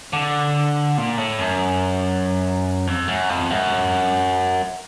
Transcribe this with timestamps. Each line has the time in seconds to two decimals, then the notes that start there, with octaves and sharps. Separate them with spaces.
0.13 D3
0.98 A#2
1.18 A2
1.39 F#2
2.87 F2
3.08 F#2
3.29 F2
3.50 F#2